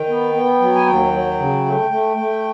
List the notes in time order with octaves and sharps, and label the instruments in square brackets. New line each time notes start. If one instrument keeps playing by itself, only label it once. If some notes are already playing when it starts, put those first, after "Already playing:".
Already playing: [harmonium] D#3 G5
B3
B3
F#3
G#5
D#2 G5
F#3
C#3
A3
A3
A3